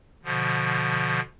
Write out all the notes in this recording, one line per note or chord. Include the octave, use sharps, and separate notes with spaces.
B2 D3 F3